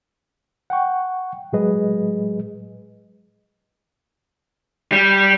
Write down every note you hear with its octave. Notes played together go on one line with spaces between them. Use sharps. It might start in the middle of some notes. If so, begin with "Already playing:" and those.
F#5 G5 C#6
A2 F#3 G#3 G#4 B4 D#5
G3